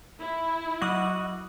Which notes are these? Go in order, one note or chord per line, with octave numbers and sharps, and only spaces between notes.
E4
F#3 F#4 D#5 F#5 D6